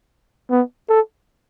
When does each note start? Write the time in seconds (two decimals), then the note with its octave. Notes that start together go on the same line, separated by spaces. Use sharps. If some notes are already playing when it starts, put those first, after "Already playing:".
0.50 B3
0.89 A4